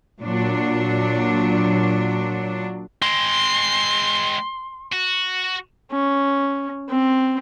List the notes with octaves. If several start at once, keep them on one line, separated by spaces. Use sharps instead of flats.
A#2 F#3 D4
G#3 C4 C6
F#4
C#4
C4